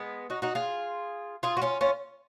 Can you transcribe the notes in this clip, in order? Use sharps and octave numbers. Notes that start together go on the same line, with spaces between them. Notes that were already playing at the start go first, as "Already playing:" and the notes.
Already playing: G#3 B3
D#4 F#4
D#4 F#4
F4 G#4
F4 G#4
F#4
C#4 F4
C#4 F4